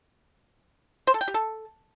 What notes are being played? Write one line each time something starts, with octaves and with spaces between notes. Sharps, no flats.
C5
A4
G5
G4
A4